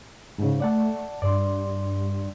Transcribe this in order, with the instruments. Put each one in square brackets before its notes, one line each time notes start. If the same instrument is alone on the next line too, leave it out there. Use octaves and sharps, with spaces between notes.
[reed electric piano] G#2 C#3
[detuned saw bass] A3 [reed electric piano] D5 F#5 A5
[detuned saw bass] G2 [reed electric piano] D5 C6